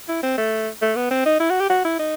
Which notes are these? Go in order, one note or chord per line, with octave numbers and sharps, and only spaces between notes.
E4
C4
A3
A3
B3
C4
D#4
E4
F#4
G4
F#4
E4
D#4